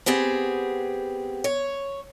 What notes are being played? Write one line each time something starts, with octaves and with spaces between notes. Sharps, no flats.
B3 C4 G4 G#4
C#5